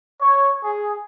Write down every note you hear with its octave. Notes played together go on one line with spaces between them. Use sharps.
C#5
G#4